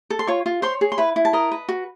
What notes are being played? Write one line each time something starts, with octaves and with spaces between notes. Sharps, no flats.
A4
C6
F4 C#5 C#6
F4
C5 C#5 C6
G#4
C6
E4 B4 B5
E4
A5
A#4 D#5 A#5
B4
F#4